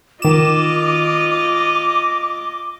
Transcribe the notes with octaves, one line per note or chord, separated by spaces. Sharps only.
D#3 F4 D#5 D6 E7